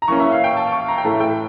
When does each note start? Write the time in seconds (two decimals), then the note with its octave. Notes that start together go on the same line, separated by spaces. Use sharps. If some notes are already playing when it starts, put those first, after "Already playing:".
0.02 A#5
0.08 E3 A#3 C#4 C#6
0.20 E5
0.32 F5
0.44 G5
0.57 A5
0.72 C#6
0.88 A#5
0.98 G5
1.05 A2 E3 A3 A5
1.20 G5